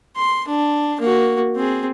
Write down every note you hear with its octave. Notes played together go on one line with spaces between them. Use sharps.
C6
D4
A#3 F#4
C4 G#4